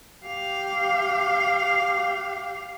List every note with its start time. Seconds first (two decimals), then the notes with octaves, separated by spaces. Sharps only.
0.25 G4 F5